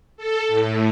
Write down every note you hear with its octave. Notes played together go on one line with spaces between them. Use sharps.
A4
A2